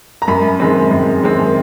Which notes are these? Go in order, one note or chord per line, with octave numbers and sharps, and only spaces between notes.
A#5
F#2 B5
D#3 G#3 C4
F#2
D#3 G#3 C4